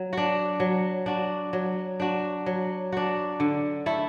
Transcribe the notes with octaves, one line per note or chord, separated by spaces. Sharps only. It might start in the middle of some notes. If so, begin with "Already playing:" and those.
Already playing: F#3
D4 F#4
F#3
D4 F#4
F#3
D4 F#4
F#3
D4 F#4
D3
A3 E4